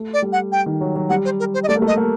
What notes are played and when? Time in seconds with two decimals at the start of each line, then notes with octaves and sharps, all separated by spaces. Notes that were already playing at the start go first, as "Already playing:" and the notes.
Already playing: A3
0.13 D5
0.22 G3
0.32 F#5
0.52 G5
0.66 D#3
0.81 F#3
0.96 F#3
1.09 G3 F#5
1.25 C5
1.39 A#4
1.54 C5
1.63 D#5
1.68 A3 D5
1.76 A#3
1.82 A3
1.87 D#5
1.97 A#3